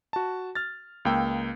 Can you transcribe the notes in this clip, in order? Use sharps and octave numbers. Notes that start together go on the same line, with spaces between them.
F#4 A5
F6 A6
C#2 A#3 G5 E6